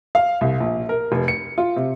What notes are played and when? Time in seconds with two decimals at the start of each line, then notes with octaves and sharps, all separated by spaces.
0.15 F5
0.41 C2
0.60 A#1
0.89 A#4
1.12 F1
1.28 C#7
1.58 F4
1.76 C3